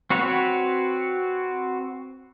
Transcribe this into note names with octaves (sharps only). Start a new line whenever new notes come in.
C4 F#4 B4 C#5